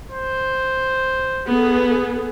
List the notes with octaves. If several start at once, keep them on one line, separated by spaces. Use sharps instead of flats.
C5
B3 G#4 A4